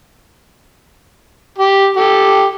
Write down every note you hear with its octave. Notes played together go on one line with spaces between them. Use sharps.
G4
G4 A4